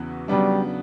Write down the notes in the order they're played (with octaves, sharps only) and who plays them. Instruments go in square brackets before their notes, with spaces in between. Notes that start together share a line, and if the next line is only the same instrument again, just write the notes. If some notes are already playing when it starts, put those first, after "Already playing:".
Already playing: [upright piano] E2 C#3 E3 B3 F#4
[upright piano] C#3 F#3 B3 D4 [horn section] G3